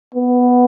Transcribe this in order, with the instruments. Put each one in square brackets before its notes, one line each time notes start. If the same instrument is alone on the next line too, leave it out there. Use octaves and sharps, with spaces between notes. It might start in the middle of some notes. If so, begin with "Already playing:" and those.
[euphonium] B3